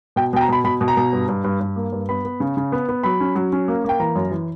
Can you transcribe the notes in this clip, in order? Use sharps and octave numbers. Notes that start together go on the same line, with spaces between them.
B2 G5
B2 G5
A#5
B2 B5
B2 B5
B2
A#5
B2
G2
G2
G2
G2
A#3
G2
B3 B5
B3
C#3
C#3
B3
B3
F#3 B5
C#4
F#3
C#4
A#3
A#3 G5
E3 A#5
F#2
E3